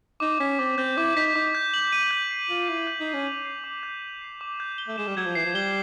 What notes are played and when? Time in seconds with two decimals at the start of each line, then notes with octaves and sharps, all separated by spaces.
0.20 D#4 D6
0.40 C#4 B6
0.59 C4 D6
0.78 C4 G6
0.97 E4 D6
1.16 D#4 B6
1.35 D#4 D6
1.55 G6
1.74 F#7
1.92 D#7
2.11 G6
2.31 C7
2.49 F4 F#7
2.68 E4 D#7
2.87 G6
3.00 D#4
3.07 C7
3.14 C#4
3.26 F7
3.46 C7
3.64 D6
3.83 G6
4.03 F7
4.21 C7
4.41 D6
4.60 G6
4.78 G7
4.88 A3
4.98 G#3 E7
5.07 G3
5.16 F#3 G#6
5.26 F3
5.35 E3 C7
5.46 F3
5.54 G3 G7